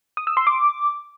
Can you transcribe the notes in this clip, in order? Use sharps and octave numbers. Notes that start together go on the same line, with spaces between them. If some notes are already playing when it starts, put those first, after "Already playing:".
D#6
E6
C6
D6